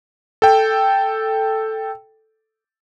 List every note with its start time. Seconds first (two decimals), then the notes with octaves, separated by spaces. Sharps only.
0.42 A4 G5